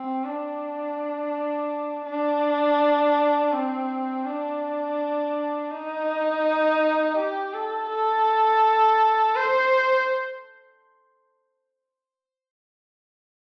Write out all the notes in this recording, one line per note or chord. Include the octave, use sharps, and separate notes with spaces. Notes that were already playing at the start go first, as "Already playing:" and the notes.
Already playing: C4
D4
D4
C4
D4
D#4
G4
A4
A4
C5